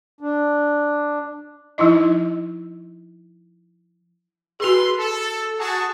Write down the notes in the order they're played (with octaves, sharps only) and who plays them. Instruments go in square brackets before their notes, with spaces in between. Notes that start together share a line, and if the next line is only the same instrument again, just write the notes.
[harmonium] D4
[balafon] F3 D#4 E4 D#5
[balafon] F#4 G#4 [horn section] B4 C6
[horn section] A4
F#4 G#4 A5